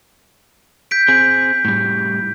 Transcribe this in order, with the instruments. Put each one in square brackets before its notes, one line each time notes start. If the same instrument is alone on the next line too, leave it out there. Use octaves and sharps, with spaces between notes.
[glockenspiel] G6 B6 D7
[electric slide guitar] C4 G#4
A2 G3